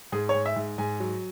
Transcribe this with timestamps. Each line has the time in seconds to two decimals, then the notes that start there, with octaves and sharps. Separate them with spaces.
0.12 G#2 G#4
0.29 C#5
0.35 G#2
0.46 E5
0.56 G#2
0.78 G#2 G#5
1.00 F#3